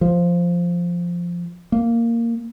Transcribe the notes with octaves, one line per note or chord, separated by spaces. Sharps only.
F3
A#3